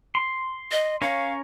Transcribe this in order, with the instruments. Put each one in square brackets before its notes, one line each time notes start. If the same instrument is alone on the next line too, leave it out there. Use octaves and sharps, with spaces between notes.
[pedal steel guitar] C6
[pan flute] D#5
[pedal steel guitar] C#4 A#4 C#5 [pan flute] F5